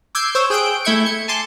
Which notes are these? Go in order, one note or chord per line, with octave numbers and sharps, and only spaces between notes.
D6 E6 G6 G#6 C7 D7
C5 C#5 E6
G#4 G5 F#6 G6 D7
A3 E4 E5 G6 G#6 C#7
C#7
G#5 A5 C6 D6